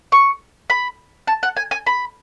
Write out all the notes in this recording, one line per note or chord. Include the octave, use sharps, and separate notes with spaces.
C#6
B5
A5
F#5
G#5
G#5
B5